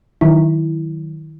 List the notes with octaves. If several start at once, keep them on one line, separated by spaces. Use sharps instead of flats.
D#3 F#3 E4